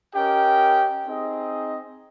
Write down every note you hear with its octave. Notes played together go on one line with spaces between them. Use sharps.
C#4 G4 A#4 D#5 G5
C4 D#4 G#4 D#5